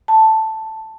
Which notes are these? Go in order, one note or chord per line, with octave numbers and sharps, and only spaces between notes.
A5